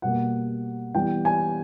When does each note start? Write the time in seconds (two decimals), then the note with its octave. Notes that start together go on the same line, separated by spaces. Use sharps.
0.02 B2 G3 A#3 F#5
0.95 E3 G3 B3 G5
1.25 G#5